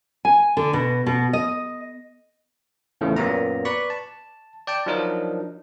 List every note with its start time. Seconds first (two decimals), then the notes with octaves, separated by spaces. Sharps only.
0.25 G#5
0.57 D3
0.73 B2
1.06 B2
1.33 D#5
3.01 E2 A2 C#3 F3 A3
3.16 F#2 A#2 F#3 A#3 B3 A#5
3.65 B4 D5 B5 C#6
3.90 A5
4.67 D5 G5 A5
4.86 F3 F#3 D4 D#4 A#4